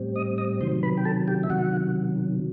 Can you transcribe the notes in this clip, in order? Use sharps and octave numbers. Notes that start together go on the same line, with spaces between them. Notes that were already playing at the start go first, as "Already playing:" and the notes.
Already playing: A2 G3 C4
D#5 D#6
D#5 D#6
C3 D#3 F#3 C5 C6
B4 B5
G5
A4 A5
G4 G5
E5
C3 D#3 F#3 F#4 F#5